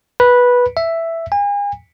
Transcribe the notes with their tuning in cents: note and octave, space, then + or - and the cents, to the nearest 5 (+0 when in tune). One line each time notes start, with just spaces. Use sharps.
B4 -10
E5 +5
G#5 -40